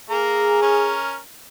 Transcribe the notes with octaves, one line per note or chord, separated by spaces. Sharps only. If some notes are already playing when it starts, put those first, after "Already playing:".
A#3 G#4 A#5
C#4 A#4